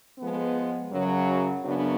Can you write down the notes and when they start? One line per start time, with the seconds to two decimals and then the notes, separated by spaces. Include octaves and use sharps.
0.19 F3 G#3 B3
0.92 F#2 C#3 F#3
1.64 F#2 C#3 F#3 B3 D4